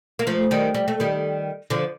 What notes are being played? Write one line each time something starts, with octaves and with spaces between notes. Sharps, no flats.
A#3
F3 A3
D#3 G3
G3
A3
D#3 G3
D3 F3